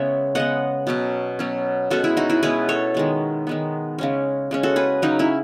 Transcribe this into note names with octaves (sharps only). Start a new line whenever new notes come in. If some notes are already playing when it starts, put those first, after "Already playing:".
Already playing: C#3 G#3 B3 C#5 E5
C#3 G#3 B3 D#5 F#5
B2 F#3 C#4
B2 F#3 C#4
B2 G#3 C#4 F#4 A4
E4 G#4
D#4 F#4
E4 G#4
B2 G#3 C#4 G#4 B4
A4 C#5
D#3 G#3 B3
D#3 G#3 B3
C#3 G#3 C#4
C#3 G#3 C#4
F#4 A4
G#4 B4
C#3 F#3 C#4 D#4
C#4 E4